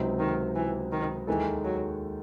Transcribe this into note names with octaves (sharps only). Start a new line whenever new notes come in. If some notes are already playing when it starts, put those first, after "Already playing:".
Already playing: C#2 C3 F#3 C4 D#4
D#3
E3
D#3
D#2 D#3 E3 G#3 D#4 A4
F#3